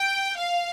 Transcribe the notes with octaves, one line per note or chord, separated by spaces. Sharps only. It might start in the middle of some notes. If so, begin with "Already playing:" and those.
Already playing: G5
F5